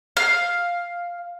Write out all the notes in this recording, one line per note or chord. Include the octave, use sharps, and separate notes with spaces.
F5